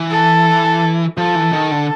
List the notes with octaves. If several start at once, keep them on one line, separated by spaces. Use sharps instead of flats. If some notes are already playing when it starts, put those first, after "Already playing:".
Already playing: E3
A4
F3 A4
E3
D#3
D3